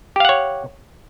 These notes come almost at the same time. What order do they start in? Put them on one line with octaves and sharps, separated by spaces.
G4 F5 F#5 C#5